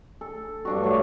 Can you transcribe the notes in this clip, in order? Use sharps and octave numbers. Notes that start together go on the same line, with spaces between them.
A4
G2 D4 F#4
F#3 A3